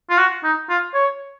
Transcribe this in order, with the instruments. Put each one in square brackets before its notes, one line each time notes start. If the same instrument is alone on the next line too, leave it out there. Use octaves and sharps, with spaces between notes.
[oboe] F4
F#4
D#4
F4
C#5